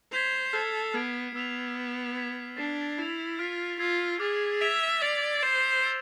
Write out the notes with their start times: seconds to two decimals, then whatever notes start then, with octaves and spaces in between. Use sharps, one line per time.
0.12 C5 G#6 B6 F7
0.53 A4 F6 G#6 C7 E7
0.94 B3 F6 G#6 D7 F7
1.35 B3 E6 B6 F7
1.76 E6 B6 E7
2.17 G#6 B6 E7
2.57 D4 A6 C7 E7
2.98 E4 A6 C7 F7
3.39 F4 F6 B6 D7
3.79 F4 E6 G#6 C7
4.20 G#4 D6 F6 A6
4.61 E5 G#6 B6 D7 F7
5.02 D5 E6 A6 C7 F7
5.42 C5 A6 E7
5.83 E6 A6 D7